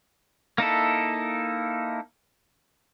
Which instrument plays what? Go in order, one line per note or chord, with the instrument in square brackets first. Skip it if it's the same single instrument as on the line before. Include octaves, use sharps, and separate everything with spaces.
[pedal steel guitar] A#3 D#4 E4 A4